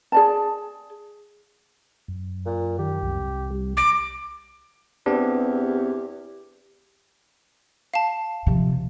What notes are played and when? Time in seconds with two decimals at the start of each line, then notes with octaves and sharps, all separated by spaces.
0.12 G#4 D5 A5
2.08 F#2
2.45 A#2
2.79 D#3 G4
3.03 C2
3.51 G3
3.77 A#5 D6
5.06 E2 B3 C4 D4 G4
7.94 F5 A5
8.47 C3 F3